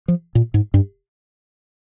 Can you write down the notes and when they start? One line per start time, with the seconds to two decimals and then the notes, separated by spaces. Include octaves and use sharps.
0.08 F3
0.35 A#2
0.54 G#2
0.74 G2